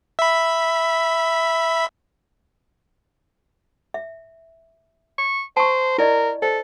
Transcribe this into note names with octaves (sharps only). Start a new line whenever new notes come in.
E5 B5
E5
C#6
C5 A5 C#6
E4 A#4 D5 D#5
A4 C5